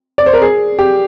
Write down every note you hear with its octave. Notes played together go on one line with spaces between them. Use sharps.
D5
C5
A#4
G#4
G4